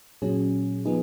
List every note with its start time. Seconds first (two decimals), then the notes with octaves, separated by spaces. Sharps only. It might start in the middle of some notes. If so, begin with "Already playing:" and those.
0.22 A#2 F#3 C#4 G#4
0.85 F3 B3 D#4 G#4